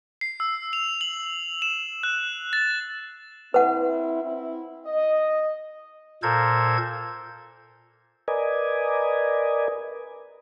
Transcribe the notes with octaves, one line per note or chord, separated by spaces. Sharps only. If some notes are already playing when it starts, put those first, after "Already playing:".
C7
E6
F7
F#7
E7
F#6
A6
C4 E4 B4 F#5
C4 E4
D#5
A#2 A4 A#4 C5 G#6
A#4 B4 D5 D#5 G#5